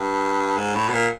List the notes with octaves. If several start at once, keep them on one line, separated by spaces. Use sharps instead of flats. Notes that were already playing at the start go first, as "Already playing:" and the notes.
Already playing: G2
G#2
A2
B2
A#2